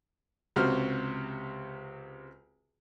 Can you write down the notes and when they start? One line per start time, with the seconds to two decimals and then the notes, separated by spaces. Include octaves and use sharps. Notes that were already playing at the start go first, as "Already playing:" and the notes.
0.56 C#2 C3 F#4 C5 F6